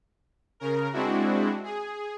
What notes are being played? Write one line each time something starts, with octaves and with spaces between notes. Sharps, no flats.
C#3 A#4
G#3 C4 D4 E4 F#4
G#4